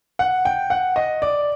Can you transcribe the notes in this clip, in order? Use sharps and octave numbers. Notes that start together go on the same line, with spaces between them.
F#5
G5
F#5
D#5
D5